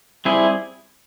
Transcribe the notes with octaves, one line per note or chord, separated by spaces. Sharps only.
G3 C4 E4 G#4